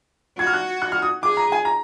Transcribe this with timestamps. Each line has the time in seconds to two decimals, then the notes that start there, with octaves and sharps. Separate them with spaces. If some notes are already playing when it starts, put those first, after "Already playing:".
0.39 F#4 G#6
0.47 F6
0.54 F#6
0.82 F#6
0.92 F6
1.02 D#6
1.23 G#4 D6
1.37 A#5
1.52 G#5
1.65 A#5